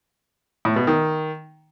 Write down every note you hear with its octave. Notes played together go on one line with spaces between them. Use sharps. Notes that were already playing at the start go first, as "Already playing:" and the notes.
A2
B2
D#3